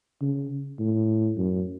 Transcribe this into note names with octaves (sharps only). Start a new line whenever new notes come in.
C#3
A2
F#2